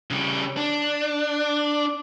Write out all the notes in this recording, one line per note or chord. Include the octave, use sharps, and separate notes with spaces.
C#3 G3
D4